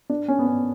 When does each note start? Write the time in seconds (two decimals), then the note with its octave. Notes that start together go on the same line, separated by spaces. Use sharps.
0.10 D4
0.28 C#4
0.39 B3
0.47 C#4